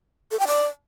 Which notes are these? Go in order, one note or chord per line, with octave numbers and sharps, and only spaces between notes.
A4
G5
D5